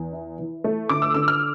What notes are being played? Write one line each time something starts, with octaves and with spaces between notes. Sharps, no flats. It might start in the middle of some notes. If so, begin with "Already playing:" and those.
Already playing: E2
E4
E3
A3
D3 D6
E6
D3 E6
F6